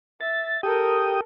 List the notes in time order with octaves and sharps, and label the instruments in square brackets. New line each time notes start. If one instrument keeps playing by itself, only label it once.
[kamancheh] E5 [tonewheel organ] A6
[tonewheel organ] G4 G5 D#6 [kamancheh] A4 A#4